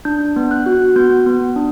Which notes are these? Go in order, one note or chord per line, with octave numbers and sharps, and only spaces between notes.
D4 G6
B3
F#6
F#4
B3 G6
B3
D4